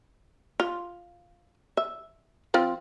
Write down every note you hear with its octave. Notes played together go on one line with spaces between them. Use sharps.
F4
E5
F3 C4 F4